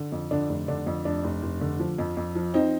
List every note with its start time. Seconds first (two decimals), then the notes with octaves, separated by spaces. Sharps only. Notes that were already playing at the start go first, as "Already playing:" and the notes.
Already playing: D3
0.12 F2
0.31 D3 D4
0.49 F1
0.68 D3 D4
0.86 F2
1.05 F1 D4
1.24 F1
1.43 F1
1.61 D3
1.80 F3
1.98 F2
2.17 F2
2.35 F3
2.54 F3 C4 D#4